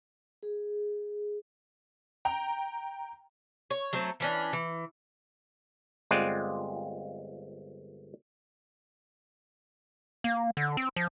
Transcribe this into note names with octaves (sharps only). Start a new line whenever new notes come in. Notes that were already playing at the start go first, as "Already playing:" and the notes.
G#4
G5 A#5 F7
C#5
F#3 A3 C4
E3 C#4 D4
E3
G1 G#3 C4 F4 D5 F#5
A#3
D3
C4
F3